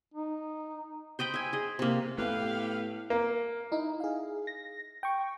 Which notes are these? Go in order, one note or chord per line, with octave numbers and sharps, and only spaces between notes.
D#4
C5 D#5 G5 B5
E5 G#5
G#4 D#5
C3 A#3
A2 A3 B3 G4 B4 F5
A#3
D#4 E4
G#4 F5
A#6
G5 C#6